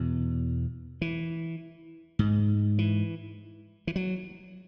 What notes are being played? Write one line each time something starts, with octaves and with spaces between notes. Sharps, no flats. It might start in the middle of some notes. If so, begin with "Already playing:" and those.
Already playing: E2 B2
E3
G#2
E3
E3
F#3